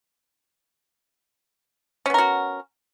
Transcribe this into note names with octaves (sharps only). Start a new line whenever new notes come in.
B3 C#4 F#4 A#4